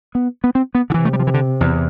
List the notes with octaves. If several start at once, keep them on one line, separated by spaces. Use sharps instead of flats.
B3
B3
C4
B3
D3
C3 E3
A3
G3
F3
E3
D3
E2